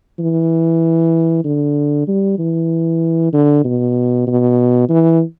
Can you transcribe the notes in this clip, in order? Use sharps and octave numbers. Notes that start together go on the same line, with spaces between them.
E3
D3
G3
E3
D3
B2
B2
E3